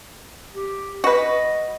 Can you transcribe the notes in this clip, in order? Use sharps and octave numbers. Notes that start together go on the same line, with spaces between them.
G4
F#4 B4 D#5